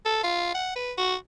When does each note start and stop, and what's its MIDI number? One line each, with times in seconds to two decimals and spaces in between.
0.05 0.19 69
0.23 0.50 65
0.54 0.74 78
0.76 0.92 71
0.98 1.15 66